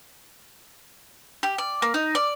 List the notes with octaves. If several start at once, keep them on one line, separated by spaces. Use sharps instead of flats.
G4
D5
A#3
D#4
D5